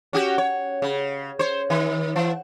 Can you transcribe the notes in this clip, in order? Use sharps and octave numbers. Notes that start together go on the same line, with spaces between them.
C#4 F#4 G4
C#5
C#3
C5 C#5
D#3
E3